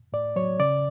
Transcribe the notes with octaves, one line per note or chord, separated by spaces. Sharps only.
A2 D5
F#3 C#5
C#3 D5